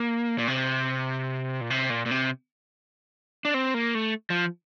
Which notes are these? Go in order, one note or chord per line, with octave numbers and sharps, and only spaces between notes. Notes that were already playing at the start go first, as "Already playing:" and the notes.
Already playing: A#3
A#2
C3
A#2
C3
A#2
A#2
C3
D4
C4
A#3
A3
F3